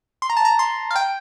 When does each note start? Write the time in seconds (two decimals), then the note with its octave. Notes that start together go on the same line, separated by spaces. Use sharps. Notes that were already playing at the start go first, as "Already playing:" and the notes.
0.22 C6
0.30 A#5
0.37 A5
0.45 A#5
0.59 C6
0.91 F5
0.96 G5